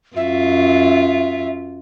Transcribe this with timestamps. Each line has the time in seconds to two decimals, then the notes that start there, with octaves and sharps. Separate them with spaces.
0.16 F#2 F4 E5